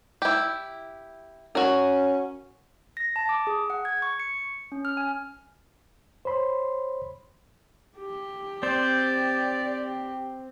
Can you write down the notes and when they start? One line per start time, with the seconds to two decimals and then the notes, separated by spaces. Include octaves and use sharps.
0.22 E4 G4
1.55 C#4 F#4 A#4
2.97 A#6
3.16 A5
3.29 D6
3.47 G#4
3.70 F#5
3.85 G#6
4.02 C#6
4.20 C#7
4.72 C#4
4.85 F6
4.97 G#5
6.25 C5 C#5 B5 C6
7.98 G4
8.63 C4 C5 D5